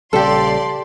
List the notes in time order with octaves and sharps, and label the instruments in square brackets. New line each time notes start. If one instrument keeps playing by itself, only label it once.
[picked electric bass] A#1 C#3 G3 [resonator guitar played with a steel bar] G4 A4 [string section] D5 C6